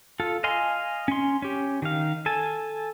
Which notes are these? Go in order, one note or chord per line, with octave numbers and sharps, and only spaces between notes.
F4 A4
D#5 F5 G#5 C6
C#4 C6
C#4 G4
D#3 F5
A4 G#5 A5